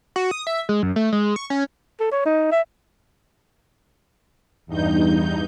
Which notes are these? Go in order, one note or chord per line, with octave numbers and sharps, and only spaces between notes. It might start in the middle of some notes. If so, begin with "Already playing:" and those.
F#4
D#6
E5
G#3
F#2
A3
G#3
C#6
C#4
A4
C#5
D#4
E5
E2 G2 D#4 G6